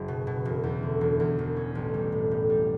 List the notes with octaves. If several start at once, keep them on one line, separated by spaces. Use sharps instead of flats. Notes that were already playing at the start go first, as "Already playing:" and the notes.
Already playing: F#1
B2
B2
E1
E2
D3
E1
E2
E1
C#4
A1
G3
A2
A2
G3